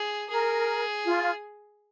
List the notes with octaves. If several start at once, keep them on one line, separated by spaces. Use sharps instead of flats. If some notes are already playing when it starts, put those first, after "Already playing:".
Already playing: G#4
G#4 A#4
F4